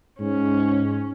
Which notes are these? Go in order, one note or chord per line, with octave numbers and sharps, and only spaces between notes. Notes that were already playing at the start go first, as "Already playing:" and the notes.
G#2 C#4